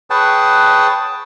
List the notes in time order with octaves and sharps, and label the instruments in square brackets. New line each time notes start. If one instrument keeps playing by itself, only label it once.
[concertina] G#4 B4 C#5 F#5 G5 A5